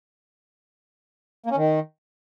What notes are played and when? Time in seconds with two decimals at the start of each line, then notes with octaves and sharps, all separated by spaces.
1.46 A#3
1.51 C#4
1.56 D#3